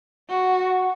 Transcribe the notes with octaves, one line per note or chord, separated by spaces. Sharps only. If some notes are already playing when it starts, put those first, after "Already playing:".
F#4